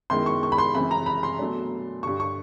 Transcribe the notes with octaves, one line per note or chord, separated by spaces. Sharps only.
F#2 D#3 G#3 B3 E4 C6
C#6
C#6
B5
C6
F#2 C#3 E3 G#3 C4 B5
A#5
B5
C6
B2 F#3 A3 D4
G2 D3 G3 C#6
C#6